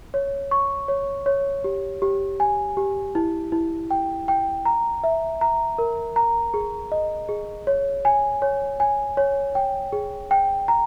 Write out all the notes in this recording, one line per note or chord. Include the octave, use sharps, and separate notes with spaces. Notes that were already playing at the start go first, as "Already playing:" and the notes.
C#5
C#6
C#5
C#5
G4
G4
G#5
G4
E4
E4
G5
G5
A#5
E5
A#5
A#4
A#5
G#4
D#5
G#4
C#5
G#5
C#5
G#5
C#5
G5
G#4
G5
A#5